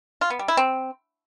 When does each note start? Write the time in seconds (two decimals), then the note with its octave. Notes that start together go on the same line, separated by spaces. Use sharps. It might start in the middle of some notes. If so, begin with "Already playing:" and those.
0.21 F4
0.30 B3
0.39 G3
0.48 E4
0.57 C4